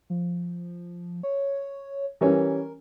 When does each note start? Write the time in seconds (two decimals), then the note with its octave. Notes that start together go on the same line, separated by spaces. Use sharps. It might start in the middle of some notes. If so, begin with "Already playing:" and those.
0.10 F3
1.23 C#5
2.21 E3 G3 C#4 A#4